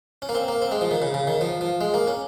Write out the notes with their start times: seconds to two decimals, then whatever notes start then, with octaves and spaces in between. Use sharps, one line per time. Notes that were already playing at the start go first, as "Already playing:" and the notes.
0.22 C#4
0.29 A#3
0.35 C4
0.48 A#3
0.62 C4
0.71 G#3
0.81 F3
0.91 D#3
1.02 C#3
1.14 C#3
1.27 D#3
1.41 F3
1.61 F3
1.81 G#3
1.94 A#3
2.07 C#4